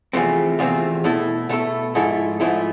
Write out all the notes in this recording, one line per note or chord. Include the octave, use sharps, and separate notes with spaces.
E2 C3 F3 A3 C4
E2 C3 F3 A3 C4
B2 A3 E4 A4
B2 A3 E4 A4
G#2 F3 A3 E4 A4
G#2 F3 A3 E4 A4